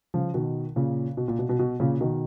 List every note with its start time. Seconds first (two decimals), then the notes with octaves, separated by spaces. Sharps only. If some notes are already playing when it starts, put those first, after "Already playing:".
0.14 C#3 F3
0.34 B2 D#3
0.76 A#2 C#3
1.17 B2
1.28 A#2
1.39 B2
1.49 B2
1.59 B2
1.80 A#2 C#3
2.00 B2 D#3